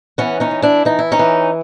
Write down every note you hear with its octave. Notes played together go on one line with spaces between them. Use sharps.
E3 B3 C#4
C#4 D#4
E3
D4 E4
E3 D#4
E4
C#4 D#4
E3